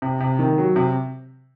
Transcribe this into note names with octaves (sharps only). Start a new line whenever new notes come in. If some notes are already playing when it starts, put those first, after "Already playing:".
C3
C3
D#3
F#3
C3